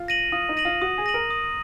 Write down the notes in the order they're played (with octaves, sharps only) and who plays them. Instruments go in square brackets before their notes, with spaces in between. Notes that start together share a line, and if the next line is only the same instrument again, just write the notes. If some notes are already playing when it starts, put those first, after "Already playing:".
Already playing: [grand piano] F4
[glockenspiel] A#6 D#7 F#7
[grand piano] F4 [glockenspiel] D#6
[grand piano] D#4
[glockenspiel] A#6 D#7 F#7
[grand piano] F4
[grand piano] F#4 [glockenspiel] D#6
[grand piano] G#4
[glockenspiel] A#6 D#7 F#7
[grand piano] A#4
[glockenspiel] D#6